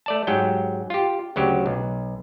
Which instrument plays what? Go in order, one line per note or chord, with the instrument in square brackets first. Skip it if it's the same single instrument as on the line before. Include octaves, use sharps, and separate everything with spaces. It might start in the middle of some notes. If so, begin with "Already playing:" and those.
[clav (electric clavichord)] A3 D5 A5
G#2 F#3 G4 G5
F4 G4
D2 C#3 F#3 G4
B1